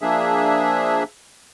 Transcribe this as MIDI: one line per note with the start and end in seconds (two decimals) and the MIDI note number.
0.02 1.03 53
0.02 1.03 58
0.02 1.03 62
0.02 1.03 68
0.02 1.03 76